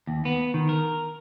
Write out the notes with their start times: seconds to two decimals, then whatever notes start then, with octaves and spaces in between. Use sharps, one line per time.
0.07 D#2
0.25 B3
0.54 D#3
0.69 A#4